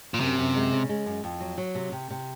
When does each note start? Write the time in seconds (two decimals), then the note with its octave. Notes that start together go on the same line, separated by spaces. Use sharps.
0.14 A#2
0.20 F#2 C3
0.38 F#2
0.55 G#3
0.72 C#3
0.89 G#3
1.06 F#2
1.24 F2
1.40 F#3
1.58 F#3
1.75 C3
1.92 C3
2.11 C3